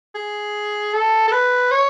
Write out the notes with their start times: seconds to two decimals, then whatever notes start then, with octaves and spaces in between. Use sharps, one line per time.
0.15 G#4
0.93 A4
1.28 A4
1.32 B4
1.71 C#5